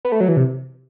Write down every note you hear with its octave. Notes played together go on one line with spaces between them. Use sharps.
B3
A3
F#3
E3
C3